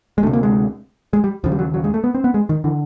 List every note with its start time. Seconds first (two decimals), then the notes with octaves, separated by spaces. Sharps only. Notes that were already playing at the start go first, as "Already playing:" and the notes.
0.18 G#3
0.23 D2 A3
0.27 C3
0.33 A#3
0.43 G#3
1.13 G#3
1.24 G3
1.44 D#2 C#3 F3
1.52 G3
1.59 F#3
1.74 F#3
1.84 G#3
1.94 A3
2.04 B3
2.14 C4
2.24 B3
2.34 G#3
2.49 D#3
2.64 D3 E3